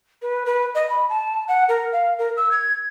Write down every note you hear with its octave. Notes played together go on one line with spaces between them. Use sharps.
B4
B4
D#5
B5
A5
F#5
A#4
F5
A#4
E6
G#6